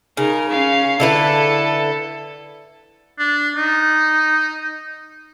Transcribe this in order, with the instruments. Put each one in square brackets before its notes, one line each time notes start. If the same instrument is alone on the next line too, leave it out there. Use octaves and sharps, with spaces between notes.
[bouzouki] C#3 [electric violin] D#4 A#4
[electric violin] C#4 F5
[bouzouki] D3 E4 B4 [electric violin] A4
[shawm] D4
D#4